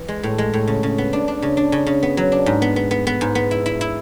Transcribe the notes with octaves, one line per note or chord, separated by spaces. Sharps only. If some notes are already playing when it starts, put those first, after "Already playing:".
Already playing: E3
G#3
A2
G#3
A2
C#3
C#3
B3
D4
D4
C#3
D4
C#3
C#3
B3
F#3
D4
G#2
B3
B3
B3
B3
G#2
B3
E4
E4
E4